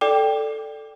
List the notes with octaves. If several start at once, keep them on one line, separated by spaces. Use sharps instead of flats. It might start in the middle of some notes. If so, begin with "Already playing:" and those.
A4 D5 G5 D6